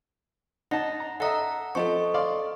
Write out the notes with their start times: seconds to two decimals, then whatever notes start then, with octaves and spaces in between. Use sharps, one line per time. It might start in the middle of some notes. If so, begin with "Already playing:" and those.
0.71 D#4 F#5 A5 A#6
1.00 A#5
1.20 A4 D#5 E5 F#5 A#5
1.75 F3 C4 A4 D#5 C#6
2.14 D5 F5 C6